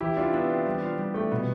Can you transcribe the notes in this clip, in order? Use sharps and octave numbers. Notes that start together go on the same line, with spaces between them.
E3 E4 G4
D4 E4 F4
B3 D4 E4
C4
G3
F4
G3
A3 G4
B2 B3